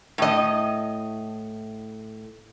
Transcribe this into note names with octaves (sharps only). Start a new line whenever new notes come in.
A2 D#5